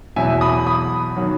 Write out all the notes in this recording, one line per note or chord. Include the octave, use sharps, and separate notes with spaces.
E2 B2 F#3 E5 G#5
B5 D#6
B5 D#6
D#3 F#3